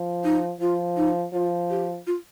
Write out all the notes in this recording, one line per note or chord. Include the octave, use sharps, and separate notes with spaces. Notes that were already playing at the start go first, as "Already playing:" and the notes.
Already playing: F3
D#4
F3 F4
D#4
F3 F4
G4
F4